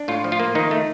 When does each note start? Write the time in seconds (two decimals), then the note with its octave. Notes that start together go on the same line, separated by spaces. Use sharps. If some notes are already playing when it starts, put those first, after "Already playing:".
Already playing: D4
0.08 A2 F4
0.24 F3
0.32 F4
0.40 A#3
0.55 D#3 D#4
0.71 A3